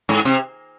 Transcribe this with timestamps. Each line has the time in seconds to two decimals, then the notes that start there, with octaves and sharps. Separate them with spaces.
0.09 G#2
0.25 C3